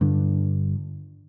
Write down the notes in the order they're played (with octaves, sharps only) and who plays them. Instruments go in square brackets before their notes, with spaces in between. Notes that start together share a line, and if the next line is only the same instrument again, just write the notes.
[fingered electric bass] G2 D3